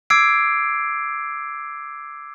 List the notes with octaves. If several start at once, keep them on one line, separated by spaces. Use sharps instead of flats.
D6 E6 G#6 C7 D7